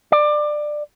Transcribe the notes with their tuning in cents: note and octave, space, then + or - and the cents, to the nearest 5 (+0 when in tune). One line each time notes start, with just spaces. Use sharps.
D5 +20